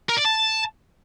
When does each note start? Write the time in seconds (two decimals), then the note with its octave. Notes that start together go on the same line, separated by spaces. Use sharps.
0.09 A#4
0.17 D5
0.25 A5